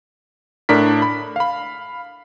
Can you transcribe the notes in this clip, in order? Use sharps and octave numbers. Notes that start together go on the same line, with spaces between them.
A2 D4 A#4 B6
B5
F5 B5